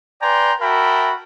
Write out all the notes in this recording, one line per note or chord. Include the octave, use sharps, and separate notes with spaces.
B4 D5 G5 G#5 A#5 C6
F#4 A#4 E5 G5 A5 B5